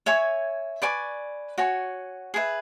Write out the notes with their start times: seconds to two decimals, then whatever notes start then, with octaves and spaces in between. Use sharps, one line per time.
0.06 C#5 E5 G#5 C#6
0.82 B4 D5 G#5 C#6
1.58 F#4 C#5 G#5
2.34 G#4 B4 E5